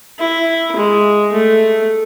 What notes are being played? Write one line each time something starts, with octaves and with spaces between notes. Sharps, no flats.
E4
G#3
A3